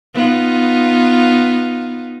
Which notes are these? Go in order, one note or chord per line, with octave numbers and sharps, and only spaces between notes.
B3 D#4 F4